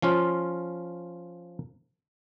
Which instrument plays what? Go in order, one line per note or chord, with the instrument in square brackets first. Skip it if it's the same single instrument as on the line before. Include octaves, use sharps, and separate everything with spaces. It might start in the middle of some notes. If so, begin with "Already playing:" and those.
[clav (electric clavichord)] F3 C#4 F4